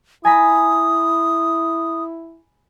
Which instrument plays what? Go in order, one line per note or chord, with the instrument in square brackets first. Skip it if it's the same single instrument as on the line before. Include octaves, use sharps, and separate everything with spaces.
[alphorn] E4 [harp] G#5 A#5 B5 [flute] D#6